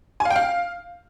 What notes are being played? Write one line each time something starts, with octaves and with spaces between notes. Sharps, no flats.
G#5
F5
G5
F5